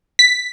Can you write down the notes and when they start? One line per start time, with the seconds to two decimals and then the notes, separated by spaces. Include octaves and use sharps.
0.19 B6